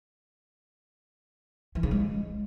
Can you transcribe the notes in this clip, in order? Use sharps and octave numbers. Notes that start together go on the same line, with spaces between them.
E3
C#3
G#3